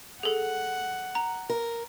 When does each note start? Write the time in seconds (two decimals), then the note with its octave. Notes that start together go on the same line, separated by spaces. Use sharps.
0.23 G#4 A4 F#5
1.15 A#5
1.50 A#4